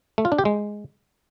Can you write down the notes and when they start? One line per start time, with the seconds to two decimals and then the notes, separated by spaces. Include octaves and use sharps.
0.18 A3
0.25 F4
0.32 D4
0.39 G4
0.45 G#3